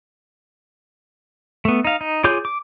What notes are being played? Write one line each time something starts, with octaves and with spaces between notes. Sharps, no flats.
A3 B3
D#4 F5
D#4
F4 G#4 C#5 D6 G6
D6